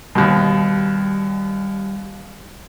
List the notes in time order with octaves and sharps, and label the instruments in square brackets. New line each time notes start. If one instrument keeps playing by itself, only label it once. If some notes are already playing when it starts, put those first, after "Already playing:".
[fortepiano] D#2 B2 [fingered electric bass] G3